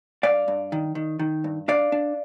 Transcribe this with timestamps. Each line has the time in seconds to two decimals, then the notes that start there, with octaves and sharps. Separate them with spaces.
0.23 G2 D5 F5
0.48 G2
0.72 D#3
0.95 D#3
1.19 D#3
1.44 G2
1.68 D4 D5 F5
1.92 D4